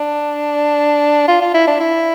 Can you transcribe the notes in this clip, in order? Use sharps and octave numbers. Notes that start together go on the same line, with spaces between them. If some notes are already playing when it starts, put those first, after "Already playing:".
Already playing: D4
F4
F4
E4
D4
E4